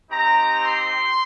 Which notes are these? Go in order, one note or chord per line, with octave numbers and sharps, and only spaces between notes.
C4 D#4 G4 A#5
C6